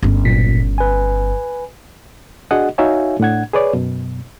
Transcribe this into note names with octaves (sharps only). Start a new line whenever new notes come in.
G1 C#4
B1 A#2 B6
B4 G#5
D4 F#4 G#4 D#5 F#5
D#4 F#4 C#5 E5 F5 G#5
A2 D4 F#5 G#6
G#4 B4 C#5 D5
F#2 B2